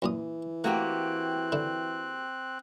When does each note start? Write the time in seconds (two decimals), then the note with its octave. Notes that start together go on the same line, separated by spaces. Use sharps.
0.02 F#2 A#2 E3 D#6
0.64 A3 A#3 C4 F#4 G4 F#6
1.52 D3 E4